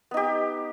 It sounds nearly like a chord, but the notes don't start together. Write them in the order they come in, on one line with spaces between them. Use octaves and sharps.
B3 D#4 G4